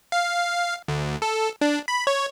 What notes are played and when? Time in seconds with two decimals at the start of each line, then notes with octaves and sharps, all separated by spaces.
0.12 F5
0.88 D2
1.22 A4
1.61 D4
1.88 B5
2.07 C#5